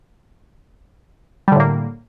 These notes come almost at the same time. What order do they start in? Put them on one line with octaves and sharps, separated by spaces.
G3 D3 A2 A#3